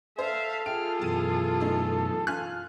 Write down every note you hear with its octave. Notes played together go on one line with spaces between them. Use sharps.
A4 C5 E5 F5
F4 G#4 G5 F6 D7
F#2 B2 E3 A5 D#7
A3 D#4
F4 G#5 F6 F#6